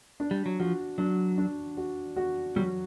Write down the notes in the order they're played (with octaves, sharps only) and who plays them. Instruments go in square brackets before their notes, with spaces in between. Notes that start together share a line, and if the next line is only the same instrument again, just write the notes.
[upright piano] D4
[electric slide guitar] G3
F#3
[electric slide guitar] F3 [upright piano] F#4
[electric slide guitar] F#3 [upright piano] D4
[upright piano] D4
F#4
F#4
[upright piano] F#3 [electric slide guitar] G3